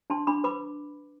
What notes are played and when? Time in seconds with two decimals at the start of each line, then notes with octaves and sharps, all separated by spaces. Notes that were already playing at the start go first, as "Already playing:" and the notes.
0.10 D4 A5 C6
0.27 D4 B5 D6
0.44 B4 B5 D6